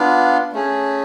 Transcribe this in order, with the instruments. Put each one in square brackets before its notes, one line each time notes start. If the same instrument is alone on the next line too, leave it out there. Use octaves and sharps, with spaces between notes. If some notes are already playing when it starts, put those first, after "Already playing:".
Already playing: [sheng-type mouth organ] B3 D4 F4
A3 C#4 G#4